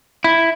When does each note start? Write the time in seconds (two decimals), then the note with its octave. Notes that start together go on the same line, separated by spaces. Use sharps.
0.24 E4